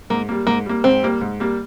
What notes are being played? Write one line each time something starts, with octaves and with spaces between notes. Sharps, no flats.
G#2 A#3
G3 A#3
G#2 A#3
G3 A#3
G#2 C4
G3 A#3
G#2
G3 A#3